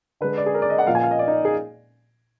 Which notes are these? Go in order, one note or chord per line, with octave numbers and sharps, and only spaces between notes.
D3 G#3 B4
D5
G#4
A#4
D5
D#5
F#5
A#2 F3 A#3 F5
G#5
F5
D#5
D5
D#4
G#4